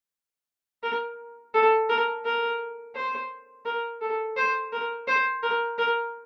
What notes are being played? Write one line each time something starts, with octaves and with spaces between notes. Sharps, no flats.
A#4
A4
A#4
A#4
C5
A#4
A4
C5
A#4
C5
A#4
A#4